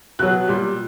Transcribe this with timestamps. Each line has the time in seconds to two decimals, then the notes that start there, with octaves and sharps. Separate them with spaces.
0.19 B2 F#3 F#6
0.48 A#2 G3